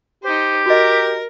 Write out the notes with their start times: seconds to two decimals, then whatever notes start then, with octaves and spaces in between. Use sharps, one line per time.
0.24 D#4 G4 C5
0.66 F#4 A#4 D#5